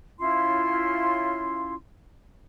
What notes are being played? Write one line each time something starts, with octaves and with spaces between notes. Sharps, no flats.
C#4 E4 F4 C6